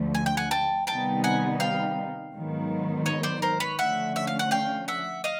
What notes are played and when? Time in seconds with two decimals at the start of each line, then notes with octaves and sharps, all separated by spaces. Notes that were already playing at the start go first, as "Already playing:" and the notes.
Already playing: D2 D3 F3 A3
0.15 G#5
0.26 G5
0.37 F#5 G#5
0.51 G5 A5
0.87 C3 D#3 G3 B3 D#4 G5 A5
1.24 F#5 G#5
1.60 F5 G5
2.33 G#2 D#3 F#3 B3
3.06 C#5 D#5
3.23 C5 D5
3.42 A#4 C5
3.60 B4 C#5
3.78 D3 F3 A3 C#4 E5 F#5
4.16 E5
4.27 F5
4.39 F#5
4.51 F5 G5
4.88 E5 F#5
5.24 D#5 F5